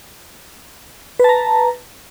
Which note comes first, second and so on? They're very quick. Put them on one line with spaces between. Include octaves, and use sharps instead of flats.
B4 A5 A#5